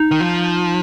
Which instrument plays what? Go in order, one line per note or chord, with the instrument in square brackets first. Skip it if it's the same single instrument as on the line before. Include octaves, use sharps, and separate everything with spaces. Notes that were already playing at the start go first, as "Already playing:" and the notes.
Already playing: [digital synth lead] D#4
[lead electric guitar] D#3
F3